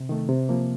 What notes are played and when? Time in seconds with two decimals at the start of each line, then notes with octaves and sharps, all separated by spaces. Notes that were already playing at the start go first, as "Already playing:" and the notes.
Already playing: C3
0.09 D#3 A3
0.29 C3
0.49 F3 A#3